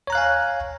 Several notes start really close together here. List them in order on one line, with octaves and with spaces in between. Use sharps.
C#5 A#5 F#6 F5 G#5